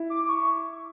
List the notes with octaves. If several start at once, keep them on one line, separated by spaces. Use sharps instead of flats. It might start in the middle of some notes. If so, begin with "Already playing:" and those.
Already playing: E4
D6
D6
C#6